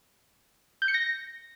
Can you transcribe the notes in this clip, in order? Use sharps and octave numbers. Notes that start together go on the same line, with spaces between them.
G6
C#7
A#6